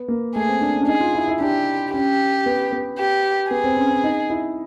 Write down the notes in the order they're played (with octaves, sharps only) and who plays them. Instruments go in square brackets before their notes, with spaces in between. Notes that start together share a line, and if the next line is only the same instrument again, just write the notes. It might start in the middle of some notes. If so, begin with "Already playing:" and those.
Already playing: [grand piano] B3
A#3
[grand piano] A3 [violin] G#4
[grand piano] C4
D4
C#4
D4
[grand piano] D#4 [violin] G#4
[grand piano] F4
E4
E4
[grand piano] D4 [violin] G4
[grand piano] C#4 [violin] G4
[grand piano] B3
B3
[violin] G4
[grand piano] B3 [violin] G#4
[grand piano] C4
C#4
C#4
D#4
E4